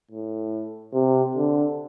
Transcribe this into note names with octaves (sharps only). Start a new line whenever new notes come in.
A2
C3
D3